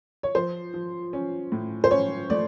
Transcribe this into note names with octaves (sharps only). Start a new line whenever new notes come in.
C#5
F3 C5
F3
C#4
A2
C5
C#4 C#5
A3 D5